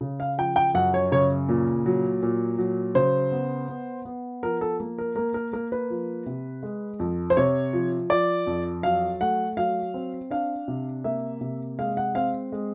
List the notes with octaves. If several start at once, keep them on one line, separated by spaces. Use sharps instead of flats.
C#3
F5
F3 G5
G5
F#2 F#5
C#5
C#3 C#5
A#2
F#3
A#2
F#3
C#3 C5
B3
B3
B3
F3 A#4
A4
A#3
A#4
A#3 A#4
A#4
A#3 A#4
B4
F3
C3
G#3
F2
C5
C3 C#5
F3
F3 D5
F2
F#3 F5
A3 F#5
F#3 F5
C4
D4 F5
C3
A#3 E5
C3
G#3 F5
F#5
C4 F5
G#3